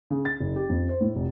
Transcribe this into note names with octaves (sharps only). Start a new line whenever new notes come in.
C#3
A6
F#1
G4
F2
C5
A2
F1